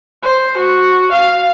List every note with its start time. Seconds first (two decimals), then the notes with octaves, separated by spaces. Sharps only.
0.23 C5
0.58 F#4
1.12 F5